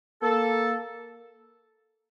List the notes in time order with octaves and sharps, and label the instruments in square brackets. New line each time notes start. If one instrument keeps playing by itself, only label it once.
[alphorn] A#3 [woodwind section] A4